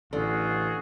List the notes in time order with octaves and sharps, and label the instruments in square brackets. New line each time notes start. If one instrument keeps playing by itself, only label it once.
[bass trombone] A1 [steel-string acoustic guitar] D3 [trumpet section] F4 F#4 G#4